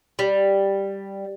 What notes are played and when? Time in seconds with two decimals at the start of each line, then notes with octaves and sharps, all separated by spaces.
0.19 G3